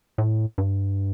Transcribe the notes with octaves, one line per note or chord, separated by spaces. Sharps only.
A2
G2